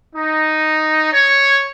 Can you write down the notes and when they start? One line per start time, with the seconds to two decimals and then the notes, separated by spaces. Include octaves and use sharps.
0.15 D#4
1.12 C#5